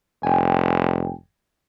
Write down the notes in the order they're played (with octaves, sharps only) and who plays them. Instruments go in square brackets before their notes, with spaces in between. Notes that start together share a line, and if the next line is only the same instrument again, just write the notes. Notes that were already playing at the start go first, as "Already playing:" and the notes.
[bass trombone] F1 [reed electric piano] G5 G#5